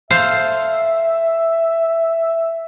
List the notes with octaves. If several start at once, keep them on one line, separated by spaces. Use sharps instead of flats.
A4 C5 E5 F5